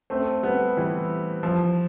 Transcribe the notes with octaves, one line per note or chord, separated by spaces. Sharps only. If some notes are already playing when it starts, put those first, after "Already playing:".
A3 C4
G3 B3
E3 G3
F3